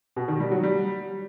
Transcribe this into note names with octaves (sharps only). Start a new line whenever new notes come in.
B2
D#3
G3
F#3
G3